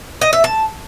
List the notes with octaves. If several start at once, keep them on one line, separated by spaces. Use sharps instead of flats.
D#5
E5
A5